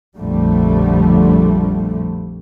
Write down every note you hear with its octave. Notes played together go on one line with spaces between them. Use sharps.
A#1 F2 D3 G3 A3